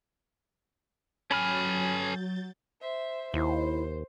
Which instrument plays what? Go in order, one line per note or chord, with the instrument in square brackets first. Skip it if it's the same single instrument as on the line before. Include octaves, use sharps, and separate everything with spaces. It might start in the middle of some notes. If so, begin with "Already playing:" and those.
[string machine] F#3 G6 A6 [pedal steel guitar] C#4 B5 F6 [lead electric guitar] A4 G#5
[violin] C5 E5
[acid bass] D#2 [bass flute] E4 [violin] C5